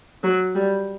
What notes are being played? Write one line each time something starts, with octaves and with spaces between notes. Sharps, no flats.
F#3
G3